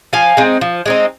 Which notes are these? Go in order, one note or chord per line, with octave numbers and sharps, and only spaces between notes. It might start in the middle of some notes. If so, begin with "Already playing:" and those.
F3 F5 G#5
G#3 C4 D#4
F3
G#3 C4 D#4